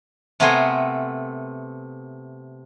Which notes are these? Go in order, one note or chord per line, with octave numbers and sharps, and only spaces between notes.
C3 A3 B3 A#4 G#5 C6